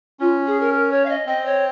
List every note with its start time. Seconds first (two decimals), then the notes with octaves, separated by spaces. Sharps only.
0.20 C#4 F4
0.47 G#4
0.60 A#4
0.73 A#4
0.91 C#5
1.05 F5
1.09 D#5
1.27 C4 D#5
1.45 C#5